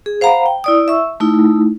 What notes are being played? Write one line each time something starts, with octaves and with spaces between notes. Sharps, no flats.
G#4
C5 F5 F#5 A#5 B5
G5
E4 D5 D#6
E5 C#6 E6
A3 D#4 E4